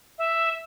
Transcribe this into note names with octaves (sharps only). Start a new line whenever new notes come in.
E5